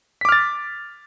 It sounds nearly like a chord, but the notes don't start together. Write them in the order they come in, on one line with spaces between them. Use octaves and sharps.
B6 D6 F6 A6